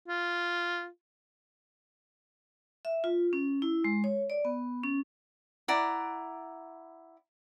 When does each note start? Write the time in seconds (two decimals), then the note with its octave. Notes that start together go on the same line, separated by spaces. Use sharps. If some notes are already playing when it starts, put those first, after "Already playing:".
0.08 F4
2.85 E5
3.04 F4
3.33 C#4
3.62 E4
3.84 G#3
4.04 C#5
4.30 D5
4.45 B3
4.84 C#4
5.68 E4 D5 F#5 A#5